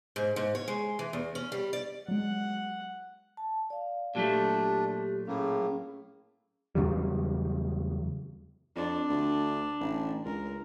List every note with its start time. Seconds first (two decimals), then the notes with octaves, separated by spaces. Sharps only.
0.16 G#2
0.36 G#2
0.55 C#5
0.68 G#3
0.99 E3
1.13 E2
1.35 C#4
1.52 G3
1.73 D5
2.08 F#3 G#3 F#5
3.37 A5
3.70 D5 F5
4.15 A#2 F#3 A3 D4 G4
5.27 A2 A#3 C#4 G#4
6.75 E2 C#3 F#3 G3
8.76 F2 D4
9.09 D2
9.80 A1
10.25 C#2 A#4